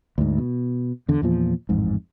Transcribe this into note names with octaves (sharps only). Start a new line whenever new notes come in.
D2 G#2
B2
E2 D3
E2 A#2 F3
A1 F2 G#2